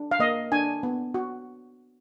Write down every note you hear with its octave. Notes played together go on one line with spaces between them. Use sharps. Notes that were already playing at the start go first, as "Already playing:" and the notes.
Already playing: D4
F5
A#3 D#5
D4 G#5
B3
F#4